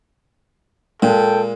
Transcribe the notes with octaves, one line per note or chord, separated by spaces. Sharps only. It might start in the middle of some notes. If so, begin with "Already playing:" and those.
A#2 G#3 A4 G5